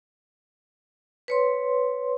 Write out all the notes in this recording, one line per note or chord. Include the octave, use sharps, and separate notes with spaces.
B4 C#5 C6